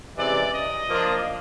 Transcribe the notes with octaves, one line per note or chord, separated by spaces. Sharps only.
C3 E3 G#3 C#4 D5
D#5
F3 A#3 D4 F4